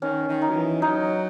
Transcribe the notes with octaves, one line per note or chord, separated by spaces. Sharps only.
D#3 C#4
D#3
D#4
F#3
E3
F#3 D#4